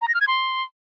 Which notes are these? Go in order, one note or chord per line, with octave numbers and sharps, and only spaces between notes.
A#5
A#6
F6
G#6
C6